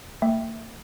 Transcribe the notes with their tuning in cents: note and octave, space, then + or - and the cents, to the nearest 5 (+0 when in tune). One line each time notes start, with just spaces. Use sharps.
A#3 -45 E5 +0 G5 +0